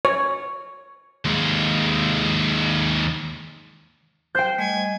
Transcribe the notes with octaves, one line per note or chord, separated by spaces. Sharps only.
C#5
D#2 G#3
C5 G5 G6
G3 A3 D#5 G#5